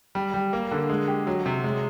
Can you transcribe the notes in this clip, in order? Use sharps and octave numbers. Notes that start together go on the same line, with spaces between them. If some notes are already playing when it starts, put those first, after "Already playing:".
G3
G3
A#3
D3
G#3
G4
F#3
C3
G#3